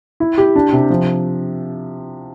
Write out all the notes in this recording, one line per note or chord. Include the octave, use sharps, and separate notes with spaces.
E4
G4
D4
C3
F3